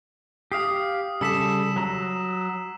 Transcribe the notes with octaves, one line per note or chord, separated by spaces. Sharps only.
G4 F5 D#6 C7
C#3 G3 A4 E6 B6 E7
F#3 A#5